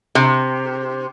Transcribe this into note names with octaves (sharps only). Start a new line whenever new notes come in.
C3